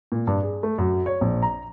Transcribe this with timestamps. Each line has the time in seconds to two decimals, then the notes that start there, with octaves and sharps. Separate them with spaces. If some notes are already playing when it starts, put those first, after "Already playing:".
0.12 A#2
0.27 G2
0.42 G#4
0.63 A3
0.78 F#2
1.06 C#5
1.21 A#1
1.43 A#5